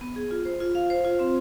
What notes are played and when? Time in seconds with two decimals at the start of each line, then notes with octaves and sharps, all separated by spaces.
0.01 B3
0.16 G#4
0.31 F4
0.45 C5
0.60 F4
0.75 F5
0.90 C5
1.05 F4
1.19 C4